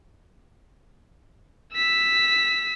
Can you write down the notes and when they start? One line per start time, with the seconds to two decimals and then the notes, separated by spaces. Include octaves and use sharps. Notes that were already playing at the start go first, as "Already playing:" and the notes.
1.74 E6 B6